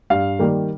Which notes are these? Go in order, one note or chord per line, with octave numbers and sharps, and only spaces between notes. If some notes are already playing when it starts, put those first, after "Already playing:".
G2 F5
D#3 G3 A#3